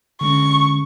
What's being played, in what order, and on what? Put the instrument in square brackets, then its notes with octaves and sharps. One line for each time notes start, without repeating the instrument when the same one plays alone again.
[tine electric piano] D3 G#3 C#4 [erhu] C#6